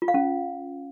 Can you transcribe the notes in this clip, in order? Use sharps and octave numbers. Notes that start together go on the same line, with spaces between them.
F4
F5
C#4